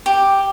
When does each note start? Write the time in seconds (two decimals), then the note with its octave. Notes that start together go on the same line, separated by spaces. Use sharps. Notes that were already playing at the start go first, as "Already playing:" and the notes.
0.06 G4